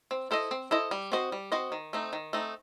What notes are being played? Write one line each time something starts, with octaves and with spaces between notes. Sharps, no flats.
C4
E4 A4 C5 D#5
C4
E4 A4 C5 D#5
G3
C4 F#4 C5 D#5
G3
C4 F#4 C5 D#5
D#3
A3 C4 D#4
D#3
A3 C4 D#4